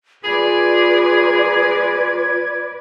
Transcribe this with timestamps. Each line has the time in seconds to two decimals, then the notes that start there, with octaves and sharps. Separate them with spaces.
0.24 F4 G#4 B4 D5 G#6